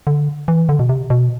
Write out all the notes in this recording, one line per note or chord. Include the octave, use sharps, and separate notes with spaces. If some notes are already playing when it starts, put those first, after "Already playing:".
D3
E3
D3
B2
C3
B2